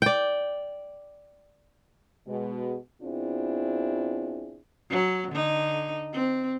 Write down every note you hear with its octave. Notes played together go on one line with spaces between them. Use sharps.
D5 G5
B2 G#3
B2 C4 D4 E4 F4 G#4
F#3
D3 D#4
C4